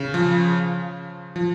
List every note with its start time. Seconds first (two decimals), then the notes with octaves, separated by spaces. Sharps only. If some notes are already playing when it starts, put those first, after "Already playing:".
Already playing: C#3
0.14 F3
1.36 F3